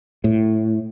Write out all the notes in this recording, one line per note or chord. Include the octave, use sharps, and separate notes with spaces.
A2